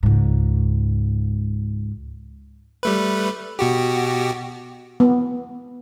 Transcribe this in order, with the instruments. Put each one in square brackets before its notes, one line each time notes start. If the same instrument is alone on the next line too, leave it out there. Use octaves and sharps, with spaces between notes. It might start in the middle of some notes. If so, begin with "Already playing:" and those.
[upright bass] C#2 G#2
[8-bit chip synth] G3 A3 B4
B2 F#4 G4
[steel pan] B3